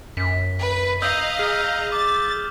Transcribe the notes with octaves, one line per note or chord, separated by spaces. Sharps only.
F#2 B6
B4
D#5 F5 A#5 D#6 E6 G6
G#4 F6
D6 A6